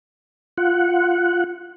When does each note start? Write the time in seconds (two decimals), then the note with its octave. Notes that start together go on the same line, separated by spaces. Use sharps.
0.58 F4 F#5